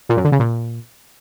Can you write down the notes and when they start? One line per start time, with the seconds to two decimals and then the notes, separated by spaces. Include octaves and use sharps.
0.09 A#2
0.17 F#2
0.24 D3
0.32 C#3
0.40 A#2